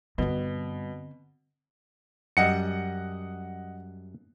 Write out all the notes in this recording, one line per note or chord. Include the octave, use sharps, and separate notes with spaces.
G2 B2 D3 C4
F#2 G3 D#5 F#5 C#7